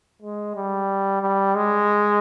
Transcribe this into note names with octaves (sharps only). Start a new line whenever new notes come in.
G#3
G3
G3
G#3